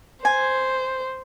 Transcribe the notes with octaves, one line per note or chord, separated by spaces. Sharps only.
C5 G#5